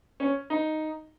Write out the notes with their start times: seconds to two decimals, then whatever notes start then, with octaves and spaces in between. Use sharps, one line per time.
0.20 C#4
0.50 D#4